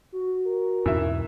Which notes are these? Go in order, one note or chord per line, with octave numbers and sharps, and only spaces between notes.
F#4
A#4
E2 G#2 B2 E3 E5